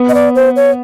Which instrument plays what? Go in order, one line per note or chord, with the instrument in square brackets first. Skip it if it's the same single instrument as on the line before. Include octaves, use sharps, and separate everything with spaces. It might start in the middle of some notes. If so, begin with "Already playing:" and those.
Already playing: [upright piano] B3
[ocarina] D#5
D5
C5
C#5